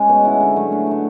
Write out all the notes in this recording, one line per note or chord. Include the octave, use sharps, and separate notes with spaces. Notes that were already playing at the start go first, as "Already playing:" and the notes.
Already playing: G#3 C#4
B2
G#3 C#4 E4
D3
F#3 A3
D3
F#3 A3